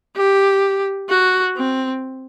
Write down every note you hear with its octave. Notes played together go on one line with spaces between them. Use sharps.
G4
F#4
C4